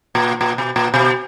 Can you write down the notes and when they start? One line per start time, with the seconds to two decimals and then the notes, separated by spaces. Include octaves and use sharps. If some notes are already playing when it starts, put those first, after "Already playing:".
0.15 A#2
0.41 A#2
0.58 B2
0.76 A#2
0.94 B2